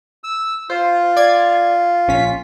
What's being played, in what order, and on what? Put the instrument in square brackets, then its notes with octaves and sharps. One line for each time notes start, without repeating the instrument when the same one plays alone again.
[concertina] E6
[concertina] F4 [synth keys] C5
[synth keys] D5 G#6
A#1 C#4 B6